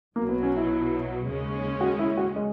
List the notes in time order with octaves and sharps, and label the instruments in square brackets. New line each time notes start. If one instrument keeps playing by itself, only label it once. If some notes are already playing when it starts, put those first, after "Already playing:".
[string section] B1 B2 F#3 [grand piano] A#3
[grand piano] B3
C#4
E4
[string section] D#2 C#3 G#3 C#4
[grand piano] F#4
E4
F#4
G#3